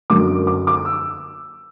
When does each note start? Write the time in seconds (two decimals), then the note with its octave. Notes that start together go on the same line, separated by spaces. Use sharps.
0.10 F#2 D3 A#3 D4 D6
0.47 D6
0.67 D6
0.85 E6